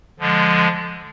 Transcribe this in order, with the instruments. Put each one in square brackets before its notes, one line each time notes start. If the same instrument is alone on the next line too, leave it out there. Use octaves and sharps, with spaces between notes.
[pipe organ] D3 F3 G#3